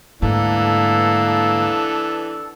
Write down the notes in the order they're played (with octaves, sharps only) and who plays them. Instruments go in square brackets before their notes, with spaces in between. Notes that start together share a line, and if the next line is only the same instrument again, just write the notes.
[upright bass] D2 G#2 [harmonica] E3 [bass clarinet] A#3 [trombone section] B3 D4 A4